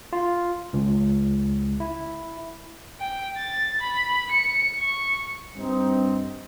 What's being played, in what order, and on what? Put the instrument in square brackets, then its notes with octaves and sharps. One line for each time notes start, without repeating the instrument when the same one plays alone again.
[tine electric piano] F4
C#2
E4
[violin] G5
A6
B5
C#7
C#6
[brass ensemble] G2 C4 D#4